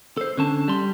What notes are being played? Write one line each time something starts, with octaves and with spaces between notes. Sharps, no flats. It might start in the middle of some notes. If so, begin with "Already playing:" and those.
A4 C5
D3 C#4 A5
G3 C6